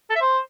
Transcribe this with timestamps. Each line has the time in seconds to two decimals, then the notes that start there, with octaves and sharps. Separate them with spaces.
0.10 A4
0.15 E5
0.21 C5